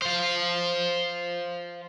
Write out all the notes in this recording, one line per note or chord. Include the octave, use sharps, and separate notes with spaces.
C5 F5